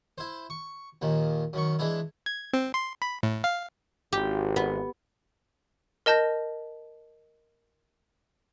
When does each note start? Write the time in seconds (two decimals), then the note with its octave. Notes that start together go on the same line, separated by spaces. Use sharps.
0.18 E4 C5
0.50 C#6
1.02 D#2 A#2 D#3
1.53 F#2 D#3 C#6
1.79 E3 G#3 D4 E4
2.26 G#6
2.53 C4
2.74 C6
3.02 B5
3.23 A2
3.44 F5
4.12 G#1 G4
4.56 B3
6.06 A#4 D#5 A5 G6 A#6